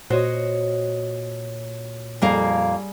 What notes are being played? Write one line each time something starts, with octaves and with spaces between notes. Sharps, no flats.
A#2 F#4 C5 C#5 D#5
F2 G3 A#3 G#4 F5